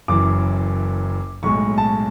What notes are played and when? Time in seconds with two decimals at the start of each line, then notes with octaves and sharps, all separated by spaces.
0.08 F#1 F#2 E3 D6
1.43 B1 A2 G#3 C#6
1.78 A5